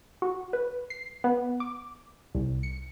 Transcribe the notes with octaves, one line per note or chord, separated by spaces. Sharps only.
F#4
B4
C7
B3
D6
C2
C#7